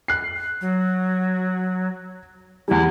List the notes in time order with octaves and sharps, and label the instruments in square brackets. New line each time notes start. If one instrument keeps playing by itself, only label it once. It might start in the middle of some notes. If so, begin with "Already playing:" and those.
[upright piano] F#6 C7
[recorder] F#3
[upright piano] E2 G3 [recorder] E4